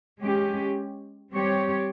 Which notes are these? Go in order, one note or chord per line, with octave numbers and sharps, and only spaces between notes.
G#3 C#4 G4
G3 C4 G4 C#5